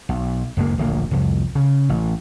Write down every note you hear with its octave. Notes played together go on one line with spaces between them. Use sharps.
B1
F#1 D2 G#3 A#3
D1 A#1 A#3
C2 F2
C#3
A1